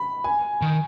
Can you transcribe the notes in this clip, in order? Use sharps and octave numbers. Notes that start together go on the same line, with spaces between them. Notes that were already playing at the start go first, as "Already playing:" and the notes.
Already playing: B5
G#5
D#3